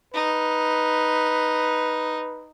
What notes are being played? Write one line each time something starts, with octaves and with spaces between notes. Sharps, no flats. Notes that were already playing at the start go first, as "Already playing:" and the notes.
D#4 B4